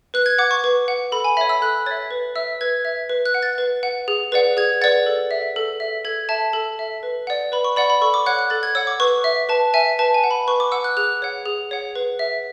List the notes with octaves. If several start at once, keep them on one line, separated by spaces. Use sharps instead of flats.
B4 F#6
G#6
F#5 D6
C#6
B4
F#5
A4 B5
G#5
C#5 E5 B5
E6
A4 F#6
C#5 E5 A6
B4
E5 E6
B4 G#6
E5
B4
F#6
F#5
A6
B4
F#5
G#4
B4 D5 F#5
G#4 G#6
B4 D5 F#5 A6
A4
E5
A4
E5
A4 G#6
E5 A5
A4
E5
B4
D5 F#5
B4 B5
C#6
D5 F#5 B5
B5
A4 C#6
D6
C#5 F#5 F#6
F#6
A4 A6
G#6
C#5 F#5 E6
D6
B4 C#6
E5
B4 A5
E5 G#5
B4 A5
G#5
F#5
B5
B4 C#6
D6
F#5 E6
F#6
G#4 F#6
C#5 F#5
G#4
C#5 F#5
B4
E5